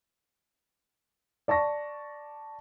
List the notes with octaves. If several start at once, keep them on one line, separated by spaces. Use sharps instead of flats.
D5 A5 C#6 A#6